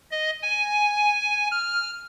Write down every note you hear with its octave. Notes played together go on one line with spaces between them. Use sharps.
D#5
G#5
F6